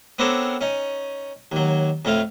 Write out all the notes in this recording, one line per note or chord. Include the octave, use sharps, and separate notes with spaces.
B3 C4 D4 A4 A#4 C#5
C#4 D#4
D#2 F#3
F2 A2 A3 F4 F5